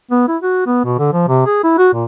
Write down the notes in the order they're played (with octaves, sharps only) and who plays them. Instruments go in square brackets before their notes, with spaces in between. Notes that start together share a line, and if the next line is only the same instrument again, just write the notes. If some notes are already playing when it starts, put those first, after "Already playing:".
[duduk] B3
E4
F#4
B3
B2
D3
F3
C3
G#4
E4
F#4
A#2